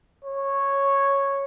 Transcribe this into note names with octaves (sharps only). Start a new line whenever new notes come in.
C#5